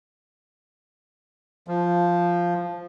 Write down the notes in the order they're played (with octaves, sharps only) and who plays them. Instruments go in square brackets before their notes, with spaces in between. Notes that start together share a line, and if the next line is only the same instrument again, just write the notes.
[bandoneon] F3